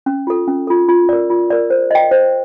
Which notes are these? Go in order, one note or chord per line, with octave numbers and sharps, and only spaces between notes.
C#4
F4 A4
C#4
F4 A4
F4
A#4 D5
F4
A#4 D5
C5
D#5 G5
C5